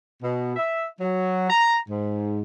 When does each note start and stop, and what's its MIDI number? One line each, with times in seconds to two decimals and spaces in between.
0.22 0.55 47
0.56 0.86 76
1.00 1.48 54
1.50 1.77 82
1.89 2.42 44